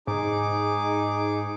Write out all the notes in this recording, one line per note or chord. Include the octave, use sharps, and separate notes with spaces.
G#2 D#4 G#4 D6